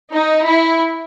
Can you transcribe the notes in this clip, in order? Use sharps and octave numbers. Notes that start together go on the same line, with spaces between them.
D#4
E4